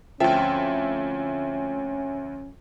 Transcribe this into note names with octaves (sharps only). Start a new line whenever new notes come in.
D2 F3 C4 C#4 F4 E5